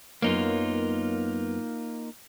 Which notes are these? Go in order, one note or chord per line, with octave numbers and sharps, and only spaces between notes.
F#2 A#3 B3 D#4 F4 C#5